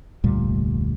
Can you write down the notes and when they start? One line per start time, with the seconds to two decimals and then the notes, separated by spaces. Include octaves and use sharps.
0.24 F1 D2 A#2 G3